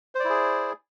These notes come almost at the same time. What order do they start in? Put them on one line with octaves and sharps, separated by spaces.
C5 D5 E4 G#4